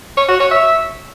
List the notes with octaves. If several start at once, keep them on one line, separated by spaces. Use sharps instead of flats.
C#5
F#4
C#5
E5